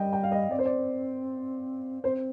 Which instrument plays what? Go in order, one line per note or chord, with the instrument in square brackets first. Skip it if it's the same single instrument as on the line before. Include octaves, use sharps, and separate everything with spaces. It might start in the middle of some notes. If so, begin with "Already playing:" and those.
Already playing: [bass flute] G3 [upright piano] D#5 G5
[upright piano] G5
F5
D#5
[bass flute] C4 [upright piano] D5
[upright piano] C5
D5
[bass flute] C4 [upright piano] C5